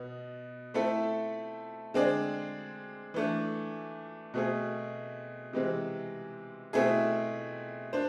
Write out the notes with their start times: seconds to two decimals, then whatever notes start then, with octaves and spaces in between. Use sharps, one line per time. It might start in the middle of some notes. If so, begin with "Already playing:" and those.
Already playing: B2 B3
0.74 A3 C4 E4 A4 E5
1.94 D3 G#3 C4 G#4 D5
3.14 E3 A3 D4
4.34 B2 A3 C4 G#4
5.53 C3 E3 G#3 C4
6.73 B2 A3 C4 E4 G#4
7.93 D4 C5